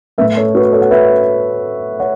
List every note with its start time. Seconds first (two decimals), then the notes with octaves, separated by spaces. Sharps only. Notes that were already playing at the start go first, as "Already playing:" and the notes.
0.18 A2 A3 B4 E5
0.36 A4 C#5
0.55 F#4 B4
0.72 A4 C#5
0.82 F#5
0.91 B4 E5
2.00 C#5 F#5